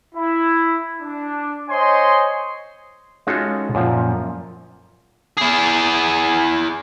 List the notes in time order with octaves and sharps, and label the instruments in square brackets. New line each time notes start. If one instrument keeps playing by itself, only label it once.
[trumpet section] E4
D4
C5 C#5 D#5 G#5 C6
[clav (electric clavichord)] G#3 C#4 D#4 F4 F#4 A4
F#2 A#2 F3
[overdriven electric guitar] E4 G#4